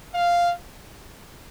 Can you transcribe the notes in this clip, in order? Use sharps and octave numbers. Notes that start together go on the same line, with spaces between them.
F5